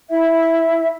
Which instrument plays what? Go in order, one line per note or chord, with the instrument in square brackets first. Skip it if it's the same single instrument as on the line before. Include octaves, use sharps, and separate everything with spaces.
[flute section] E4 E5